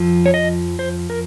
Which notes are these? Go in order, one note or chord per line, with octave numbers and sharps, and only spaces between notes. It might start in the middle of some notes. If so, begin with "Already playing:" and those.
Already playing: F2 F3
C#5
D#5
C5
A#4